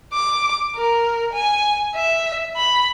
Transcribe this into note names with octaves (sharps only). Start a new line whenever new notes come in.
D6
A#4
G#5
E5
B5